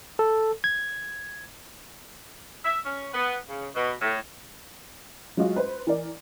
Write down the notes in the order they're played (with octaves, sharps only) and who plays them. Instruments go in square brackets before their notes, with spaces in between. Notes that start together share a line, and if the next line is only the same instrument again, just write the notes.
[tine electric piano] A4
G#6
[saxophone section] E5
C#4
B3
C#3
B2
A2
[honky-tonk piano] F#3 G#3 F4 F#4 D#5
B4 C5
E3 A#4 D5